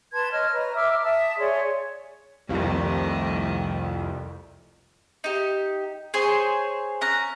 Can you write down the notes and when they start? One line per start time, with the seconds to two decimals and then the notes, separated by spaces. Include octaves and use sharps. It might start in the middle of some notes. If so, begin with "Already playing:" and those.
0.13 B4 A5 C6 G#6
0.31 C#5 D#5 F6
0.52 B4 C#5 A#5
0.74 E5 D6 E6 F6
1.03 E5 A5 D#6
1.38 G#4 C#5 D5 C6
2.49 C2 F2 D#3 G3 A3
5.24 D#4 G4
6.14 G#4 C5 C#5 G#5
7.01 C#4 A#5 F#6